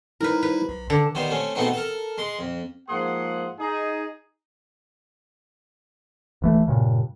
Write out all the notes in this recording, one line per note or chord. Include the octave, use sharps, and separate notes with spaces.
G3 D#4 E4 A#4 B4
B4
B1
D3 A5
D#3 G3 B3 C5
A3 C4 C#4
G#2 B2 A3 B3 C4 D#4
A4 A#4
G#3 C6
F2
G#2 F3 A#3 G#4 F#5 C6
D#4 G#4
D1 E3 A3
G2 A#2 C#3